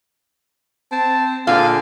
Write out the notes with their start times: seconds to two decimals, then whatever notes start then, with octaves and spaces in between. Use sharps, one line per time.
0.92 C4 A5
1.47 A#2 D3 G#4 F5